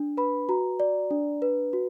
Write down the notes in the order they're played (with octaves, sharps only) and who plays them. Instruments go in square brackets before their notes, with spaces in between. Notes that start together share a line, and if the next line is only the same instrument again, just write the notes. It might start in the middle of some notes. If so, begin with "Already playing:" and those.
Already playing: [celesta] D4
B4 B5
F#4 A#5
D5
D4
B4
F#4